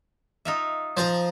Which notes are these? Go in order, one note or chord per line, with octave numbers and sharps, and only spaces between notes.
D#4 F4 E5
F3 C5 A5 A#5